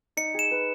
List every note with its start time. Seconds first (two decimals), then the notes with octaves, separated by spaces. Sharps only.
0.17 D#4 C#7
0.34 G#4 E7
0.51 B4